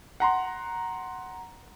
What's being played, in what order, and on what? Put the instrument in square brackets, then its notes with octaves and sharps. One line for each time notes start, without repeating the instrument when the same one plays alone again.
[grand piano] F#5 A#5 C6